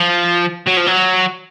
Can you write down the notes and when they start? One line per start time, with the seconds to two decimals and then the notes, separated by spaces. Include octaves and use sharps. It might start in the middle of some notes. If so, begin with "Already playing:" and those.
Already playing: F3
0.67 F#3
0.77 F3
0.87 F#3